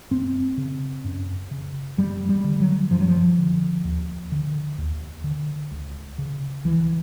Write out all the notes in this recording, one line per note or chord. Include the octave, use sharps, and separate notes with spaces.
F#2 C4
C#3
F#2
C#3
F#2 G3
G3
D3
F#3
F#2 F3
F#3
F3
D3
D#2
D3
D#2
D3
C#2
C#3
C#2 E3